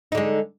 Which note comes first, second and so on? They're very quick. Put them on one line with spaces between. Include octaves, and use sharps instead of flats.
D#4 D3 G#3